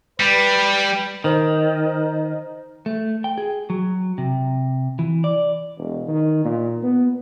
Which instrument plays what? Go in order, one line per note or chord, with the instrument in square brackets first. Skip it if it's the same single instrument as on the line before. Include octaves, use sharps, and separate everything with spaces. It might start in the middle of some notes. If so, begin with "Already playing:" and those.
[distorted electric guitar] G3 [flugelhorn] B4
[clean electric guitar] D#3 [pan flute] C5
[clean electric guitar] A3
G5
G#4
F#3
C3
E3
D5
[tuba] E1
D#3
A#2
B3